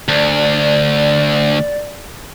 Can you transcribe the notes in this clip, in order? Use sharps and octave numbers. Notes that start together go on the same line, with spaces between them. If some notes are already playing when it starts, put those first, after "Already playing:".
D2 D5